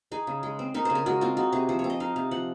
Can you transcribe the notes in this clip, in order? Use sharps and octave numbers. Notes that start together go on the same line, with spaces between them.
D#4 G#4
C#3
G#3
C4
D#4 A#4
C#3 C5
A#4
G#3 F#4
C4 F4
D#4 F#4
C3 G#4
F3 C5
C#5
C4
D#5
D#4 F5
C3 F5
F3 F#5